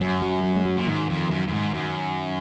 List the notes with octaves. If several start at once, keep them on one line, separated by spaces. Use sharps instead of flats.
F#2 F#3
F#3
F#3
G#3
F#3
A#2
G#2 D#3
F2
F#2
F#2
G#2
F#2